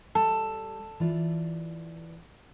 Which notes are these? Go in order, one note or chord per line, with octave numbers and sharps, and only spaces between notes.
G3 A4
E3 F4 D5